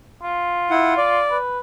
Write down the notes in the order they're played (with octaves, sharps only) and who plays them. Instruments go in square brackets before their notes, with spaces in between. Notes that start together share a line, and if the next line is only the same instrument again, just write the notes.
[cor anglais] F4
[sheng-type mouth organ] E4 F#5
D5
[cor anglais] B4